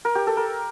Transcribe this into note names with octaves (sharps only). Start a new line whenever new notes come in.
A#4
G4
A4
A#4